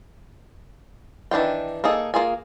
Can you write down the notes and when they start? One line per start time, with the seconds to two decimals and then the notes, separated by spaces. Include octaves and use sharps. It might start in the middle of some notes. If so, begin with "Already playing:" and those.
1.31 D#3 E3 D4 F4 G5
1.84 A#3 D#4 G#4 A4
2.14 A#3 F4 G#4 G#5